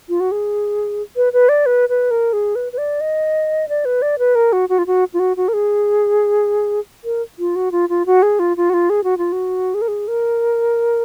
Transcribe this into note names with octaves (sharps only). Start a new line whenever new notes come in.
F4
F#4
G#4
B4
B4
D5
B4
B4
A#4
G#4
B4
B4
D5
D#5
D5
B4
D5
B4
A#4
F#4
F#4
F4
F#4
F4
F#4
F#4
A#4
G#4
A#4
F4
F#4
F4
F4
F#4
G#4
F4
F4
F#4
F4
G#4
F#4
F4
F#4
G#4
A#4
G#4
A#4